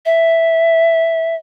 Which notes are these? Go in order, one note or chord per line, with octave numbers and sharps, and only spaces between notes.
E5